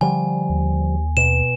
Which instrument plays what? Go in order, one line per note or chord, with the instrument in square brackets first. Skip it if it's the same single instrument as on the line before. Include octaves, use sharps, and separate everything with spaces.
[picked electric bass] D3 F3 G3 [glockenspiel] G#5
[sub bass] D#2
[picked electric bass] B2 [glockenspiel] E7